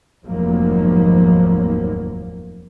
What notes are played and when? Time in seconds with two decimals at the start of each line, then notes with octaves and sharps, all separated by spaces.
0.25 F1 D#2 G#2 F3 F#3 A#3